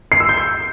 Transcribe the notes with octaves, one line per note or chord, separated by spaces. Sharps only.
C7
E6
G6
C7